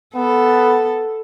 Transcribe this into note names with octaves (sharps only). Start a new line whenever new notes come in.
B3 A4